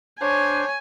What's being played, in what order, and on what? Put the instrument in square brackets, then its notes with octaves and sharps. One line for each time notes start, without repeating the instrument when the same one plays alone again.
[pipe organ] D4 C5 [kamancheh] C#5 [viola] G#5